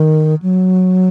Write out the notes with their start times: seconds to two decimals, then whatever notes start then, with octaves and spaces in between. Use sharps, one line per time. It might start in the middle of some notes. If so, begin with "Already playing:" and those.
Already playing: D#3
0.42 F#3